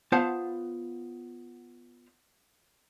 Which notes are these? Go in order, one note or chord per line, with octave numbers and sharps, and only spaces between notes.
B3 F4 C5 F5 F#5 A5